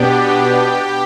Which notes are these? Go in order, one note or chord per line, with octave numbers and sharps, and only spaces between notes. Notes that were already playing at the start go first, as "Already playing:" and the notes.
Already playing: B2 B3 D4 G4